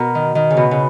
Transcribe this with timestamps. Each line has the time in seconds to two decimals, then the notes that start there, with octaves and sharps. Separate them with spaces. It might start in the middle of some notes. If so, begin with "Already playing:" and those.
Already playing: B2 A#4
0.15 D#3
0.35 D#3
0.51 C#3
0.57 B2 B4
0.71 C#3